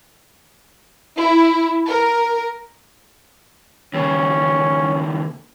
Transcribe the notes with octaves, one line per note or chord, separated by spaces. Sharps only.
E4
A#4
D#2 C#3 C#4